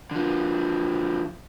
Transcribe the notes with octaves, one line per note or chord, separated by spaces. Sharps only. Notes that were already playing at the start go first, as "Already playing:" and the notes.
D3 F3